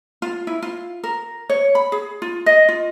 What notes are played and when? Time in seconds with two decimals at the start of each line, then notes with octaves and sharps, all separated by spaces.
0.22 F4
0.47 E4
0.63 F4
1.04 A#4
1.50 C#5
1.75 B5
1.92 G#4
2.22 F4
2.46 D#5
2.69 F4